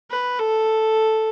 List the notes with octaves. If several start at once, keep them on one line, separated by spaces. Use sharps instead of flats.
B4
A4